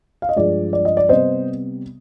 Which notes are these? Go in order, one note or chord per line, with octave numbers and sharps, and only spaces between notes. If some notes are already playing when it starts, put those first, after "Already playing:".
F5
D#5
G2 F3 G#3 D5
D5
D#5
D5
C3 G3 B3 C5 D#5